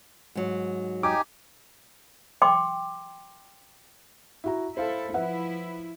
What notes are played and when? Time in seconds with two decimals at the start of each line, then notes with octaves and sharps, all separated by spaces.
0.35 G#2 F#3
1.03 D#4 G4 G#5 D6
2.42 G5 C6 D6
4.44 E4 F#4 A#5
4.77 E4 A4 C5 F5
5.14 F3 E4 B4 E5 F#5